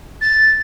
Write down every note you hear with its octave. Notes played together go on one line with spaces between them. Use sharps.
A6